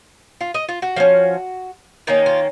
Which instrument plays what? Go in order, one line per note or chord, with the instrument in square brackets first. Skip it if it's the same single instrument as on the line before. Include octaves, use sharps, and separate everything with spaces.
[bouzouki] F4
D#5
F4
F#4
F3 A#3 C#4
D#3 A#3 C#4 D#4
F4